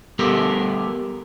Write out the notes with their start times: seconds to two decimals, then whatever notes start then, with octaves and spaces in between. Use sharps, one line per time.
0.19 G3 B3 G4 A4 A#4